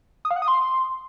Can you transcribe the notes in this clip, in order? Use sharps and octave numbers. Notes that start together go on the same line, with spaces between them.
D#6
F5
F#5
D#6
C6